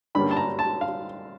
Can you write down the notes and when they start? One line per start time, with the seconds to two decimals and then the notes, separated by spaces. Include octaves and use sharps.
0.15 G2 D3 G3 A#3 C#4 B5
0.31 A5
0.37 A#5
0.59 A5
0.81 F5